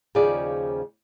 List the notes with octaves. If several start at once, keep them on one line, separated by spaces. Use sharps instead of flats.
D#2 C#3 F3 F4 G#4 D5